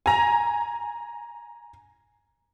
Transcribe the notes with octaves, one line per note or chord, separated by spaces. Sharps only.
G#5 A#5